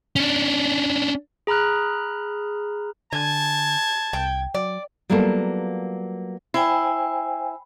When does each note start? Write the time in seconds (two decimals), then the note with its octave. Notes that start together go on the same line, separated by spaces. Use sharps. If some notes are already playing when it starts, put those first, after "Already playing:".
0.16 C#4 D4
1.47 G#4 A#5 B5 F6 F#6
3.13 D3 G#5 A5 G#6
4.13 C2 G5
4.55 F#3 D5
5.10 F#3 G3 A#3 B3 F4 A4
6.54 E4 C5 G5 G#5